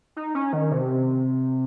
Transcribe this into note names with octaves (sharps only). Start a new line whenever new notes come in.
D#4
C#4
D#3
C3